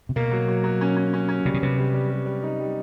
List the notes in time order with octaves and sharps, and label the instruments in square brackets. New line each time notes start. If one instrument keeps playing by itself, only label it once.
[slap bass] C3
[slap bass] B2 [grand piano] A#3
[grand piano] F#3
F#3
F#3
C#4
C#4
C#4
C#4
[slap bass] C3 [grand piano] G3
[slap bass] B2
[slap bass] C3 [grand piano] B3
[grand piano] G3
G3
G3
G3
D#4
G3